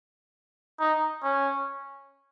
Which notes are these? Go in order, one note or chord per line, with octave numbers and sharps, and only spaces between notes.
D#4
C#4